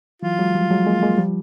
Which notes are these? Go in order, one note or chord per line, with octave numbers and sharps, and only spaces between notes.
E3 F#3 F4
F#3 G#3
F3 G3
F#3 G#3
G#3 A#3
G#3 A#3
F3 G3